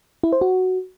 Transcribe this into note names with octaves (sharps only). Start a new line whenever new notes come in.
E4
C5
F#4